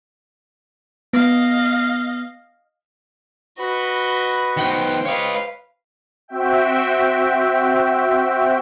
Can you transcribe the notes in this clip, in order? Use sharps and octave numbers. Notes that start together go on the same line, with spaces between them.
B3 D#5 F5
F#4 B4 D#5 B5
D#3 B3 C5 G5
B4 C#5 D#5 F5
C4 F#4 E5 G5